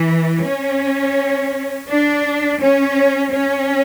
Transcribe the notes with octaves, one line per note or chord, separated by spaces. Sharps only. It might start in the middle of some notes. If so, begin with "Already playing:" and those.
Already playing: E3
C#4
D4
C#4
C#4